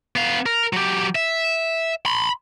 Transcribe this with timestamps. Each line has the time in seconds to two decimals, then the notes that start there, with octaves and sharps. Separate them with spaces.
0.16 B3 F5
0.46 A#4
0.73 F#3 G4
1.15 E5
2.06 B5 C6